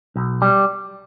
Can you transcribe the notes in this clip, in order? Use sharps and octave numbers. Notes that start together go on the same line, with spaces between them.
B1
G3